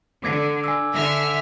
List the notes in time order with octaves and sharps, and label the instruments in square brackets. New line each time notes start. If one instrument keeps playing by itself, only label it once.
[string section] D3 [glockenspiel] D6 G#6
[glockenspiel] G#5 E6
[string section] D3 E5 F6